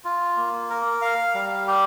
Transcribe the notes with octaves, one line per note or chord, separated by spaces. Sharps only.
F4
A#3
A#4
F5
G3
G4